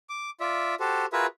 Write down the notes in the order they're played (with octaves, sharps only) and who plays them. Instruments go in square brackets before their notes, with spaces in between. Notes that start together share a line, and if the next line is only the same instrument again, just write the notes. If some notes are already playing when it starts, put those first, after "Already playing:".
[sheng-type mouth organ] D6
F4 D5 E5
F#4 G4 A4 C5
F4 F#4 G#4 A#4 B4 E5